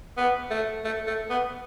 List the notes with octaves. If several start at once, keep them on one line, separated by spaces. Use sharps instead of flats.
B3
A3
A3
A3
B3